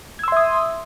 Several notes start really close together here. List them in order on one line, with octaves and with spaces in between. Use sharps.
G#6 E6 C6 E5 D#6